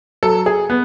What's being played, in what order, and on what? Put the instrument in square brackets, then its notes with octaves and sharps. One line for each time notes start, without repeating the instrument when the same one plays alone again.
[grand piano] F#3 [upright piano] A4
[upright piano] G#4
[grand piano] B3